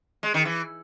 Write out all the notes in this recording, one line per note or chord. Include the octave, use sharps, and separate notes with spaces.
G#3
D#3
E3